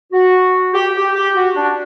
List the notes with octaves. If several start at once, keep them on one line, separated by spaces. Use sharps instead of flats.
F#4
G4
G4
G4
F#4
D4